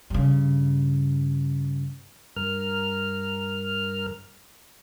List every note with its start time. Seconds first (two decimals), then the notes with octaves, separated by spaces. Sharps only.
0.10 G2 C#3
2.36 G2 A#4 F6